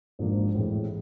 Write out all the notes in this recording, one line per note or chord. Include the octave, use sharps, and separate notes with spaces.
G#1 G#2 F3 A#3 D4
A1 A2 E3 G#3 C4